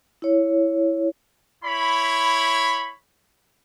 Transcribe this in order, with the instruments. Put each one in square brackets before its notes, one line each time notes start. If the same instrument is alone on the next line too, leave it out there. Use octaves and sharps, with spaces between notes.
[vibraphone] E4 C#5
[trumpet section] E4 C#5 B5